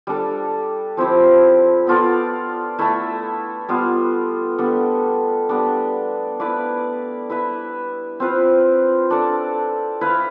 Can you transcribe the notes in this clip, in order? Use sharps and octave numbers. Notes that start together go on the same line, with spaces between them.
G3 D4 A4
F3 C4 E4 G4
B3 F4 A4 D5
A3 E4 A4 E5
G3 B3 F4
G3 B3 D4 A4
G3 B3 D4
E4 B4 D5 F5
E4 B4 E5
C4 F4 B4
D4 A4 D5
E4 B4 F5